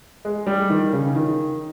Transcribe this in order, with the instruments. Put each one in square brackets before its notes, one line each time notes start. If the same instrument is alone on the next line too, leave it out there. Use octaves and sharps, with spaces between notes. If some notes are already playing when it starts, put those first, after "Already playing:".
[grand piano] G#3
G3
D#3
C#3
D#3